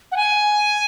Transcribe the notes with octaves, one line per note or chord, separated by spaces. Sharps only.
F#5
G#5